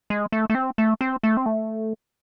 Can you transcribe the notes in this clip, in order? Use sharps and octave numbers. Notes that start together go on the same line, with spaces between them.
G#3
A3
A3
C4
A3
C4
A3
C4
A3